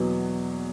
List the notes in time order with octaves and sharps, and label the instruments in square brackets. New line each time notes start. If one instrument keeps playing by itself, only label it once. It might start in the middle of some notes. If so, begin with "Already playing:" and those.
Already playing: [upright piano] E2 B2 F#3 B3